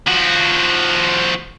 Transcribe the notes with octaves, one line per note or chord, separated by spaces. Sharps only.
F3 F#4